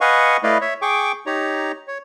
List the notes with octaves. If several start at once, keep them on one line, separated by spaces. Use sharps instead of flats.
B4 D#5 F5 F#5 G#5 C#6
A3 E4 B4 D5 D#5 F5
C#5 E5
G#4 G5 C#6 D6
D#4 G4 C#5 A#5
C#5